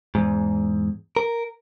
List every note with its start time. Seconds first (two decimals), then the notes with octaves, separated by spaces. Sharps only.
0.15 E2 G#2
1.17 A#4